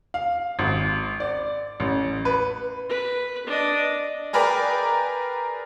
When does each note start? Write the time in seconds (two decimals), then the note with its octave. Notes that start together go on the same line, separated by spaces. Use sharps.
0.14 F5
0.59 G#1
1.20 D5
1.80 A1
2.25 B4
2.89 B4
3.46 D4 D#5
4.33 G#4 A#4 B4 D5 G5